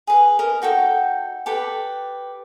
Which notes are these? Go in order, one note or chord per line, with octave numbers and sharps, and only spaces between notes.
G#4 B4
A#4 D#5
D#4 F#4 A4 G5
G4 A4 B4